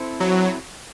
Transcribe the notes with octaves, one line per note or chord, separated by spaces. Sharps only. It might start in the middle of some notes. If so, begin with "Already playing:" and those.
Already playing: C4 E4 A4 C5
F#3